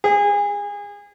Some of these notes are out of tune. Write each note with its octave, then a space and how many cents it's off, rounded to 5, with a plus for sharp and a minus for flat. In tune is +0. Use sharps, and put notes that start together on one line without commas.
G#4 -30